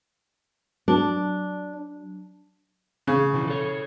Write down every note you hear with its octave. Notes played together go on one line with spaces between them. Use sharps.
F#3 D4
C#3
B2 E3 F3
A4 C#5